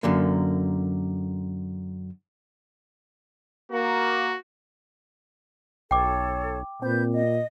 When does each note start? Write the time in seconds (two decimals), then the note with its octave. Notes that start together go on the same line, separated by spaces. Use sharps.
0.03 F#2 D3 A#3
3.72 A#3 F#4
5.91 B1 A4 C#5 G5 D6
6.82 A#2 C4 B4 G6
7.12 D#5